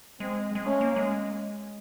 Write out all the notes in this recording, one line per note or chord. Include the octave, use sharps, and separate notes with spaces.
G#3 C4
G#3
A3 C#4
A#3
G#3